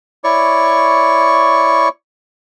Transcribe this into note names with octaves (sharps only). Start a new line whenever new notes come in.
E4 C#5 D5 C#6